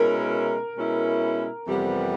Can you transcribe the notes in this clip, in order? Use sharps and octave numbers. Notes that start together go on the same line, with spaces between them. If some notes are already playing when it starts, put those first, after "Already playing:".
Already playing: B2 G#3 C#4 E4 A#4
B2 G#3 C#4 E4
F2 C3 E3 G3 B3